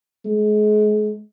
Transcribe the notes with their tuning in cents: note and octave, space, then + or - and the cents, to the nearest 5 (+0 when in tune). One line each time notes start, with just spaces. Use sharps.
G#3 +35